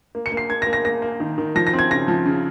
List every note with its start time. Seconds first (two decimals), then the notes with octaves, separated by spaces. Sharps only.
0.15 A#3
0.26 C#7
0.32 A#3
0.37 C7
0.50 A#3 G#6
0.62 A#6
0.67 A#3
0.73 A#6
0.85 A#3 A#6
1.02 A#3
1.20 D#3
1.38 D#3
1.55 F3 A#6
1.67 A#6
1.73 C4
1.79 G#6
1.91 C#3 A#6
2.08 F3
2.26 C#3